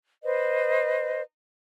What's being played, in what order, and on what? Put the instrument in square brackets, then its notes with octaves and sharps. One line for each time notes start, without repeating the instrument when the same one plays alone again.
[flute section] B4 C5 D#5